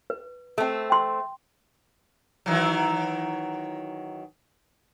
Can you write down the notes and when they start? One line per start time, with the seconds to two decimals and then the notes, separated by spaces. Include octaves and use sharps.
0.10 B4
0.58 A3 C4
0.90 G5 C6
2.46 D#3 E3 F#3